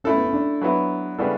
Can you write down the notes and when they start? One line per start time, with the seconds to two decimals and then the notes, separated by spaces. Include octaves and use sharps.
0.04 A3 C#4 E4 A4
0.15 B3
0.24 C#4
0.33 D4
0.61 F#3 B3 E4
1.18 C#3 G3 B3 D4 E4 A4